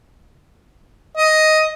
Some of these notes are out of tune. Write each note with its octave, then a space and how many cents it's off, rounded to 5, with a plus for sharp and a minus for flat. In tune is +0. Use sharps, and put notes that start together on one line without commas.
D#5 +5